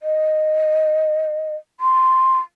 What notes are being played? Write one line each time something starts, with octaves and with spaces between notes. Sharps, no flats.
D#5
C6